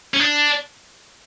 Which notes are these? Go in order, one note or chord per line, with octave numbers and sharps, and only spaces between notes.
C#4
D4